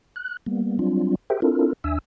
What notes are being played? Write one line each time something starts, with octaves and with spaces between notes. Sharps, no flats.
F#6
G3 A#3 B3
F#3 G3 C4 D4 F4
G4 G#4 A#4 C5 E5 G5
C4 D4 E4 F4 A4 A#4
D#2 D4 E5 G#5 E6